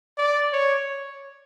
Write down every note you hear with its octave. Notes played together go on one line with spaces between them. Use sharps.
D5
C#5